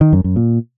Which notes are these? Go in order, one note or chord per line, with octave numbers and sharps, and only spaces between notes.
D#3
F#2
F#2
A#2